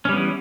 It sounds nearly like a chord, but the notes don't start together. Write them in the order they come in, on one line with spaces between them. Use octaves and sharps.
C#4 G3 B3 E3